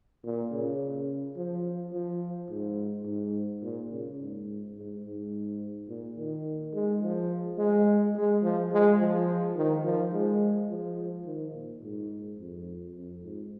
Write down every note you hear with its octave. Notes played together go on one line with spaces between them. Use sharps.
A#2
C#3
F3
F3
G#2
G#2
A#2
C#3
G#2
G#2
G#2
A#2
D#3
G#3
F3
G#3
G#3
F3
G#3
F3
D#3
F3
G#3
F3
D#3
A#2
G#2
F2
F2
G#2